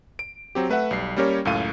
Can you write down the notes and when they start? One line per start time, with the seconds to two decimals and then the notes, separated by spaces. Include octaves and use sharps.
0.19 D7
0.55 F#3 C4 G4
0.69 A3 B4 E5 F#5
0.91 B1 G3 C7
1.17 G3 A#3 C#4 G4 A#4 C#5
1.45 C#2 F#2 A2 A4 F5 D#7